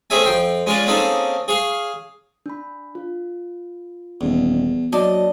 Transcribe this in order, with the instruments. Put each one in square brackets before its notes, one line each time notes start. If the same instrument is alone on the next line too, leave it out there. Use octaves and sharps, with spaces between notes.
[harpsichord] A3 C4 C#4 G#4 E5 G#5
F2 G5 C6
G#3 C#4 F4 C#5 D5
A#3 C4 C#4 D#4 G#4 A4
G#4 C#5 F5
[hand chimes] D4 B5
F4
[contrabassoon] D#1 [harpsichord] E2
[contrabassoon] F#3 [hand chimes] A#3 [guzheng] D4 [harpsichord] D#5